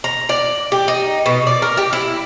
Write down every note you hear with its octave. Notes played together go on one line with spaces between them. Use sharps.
A#5
D5
G4
D#4
B2
D5
A#4
G4
E4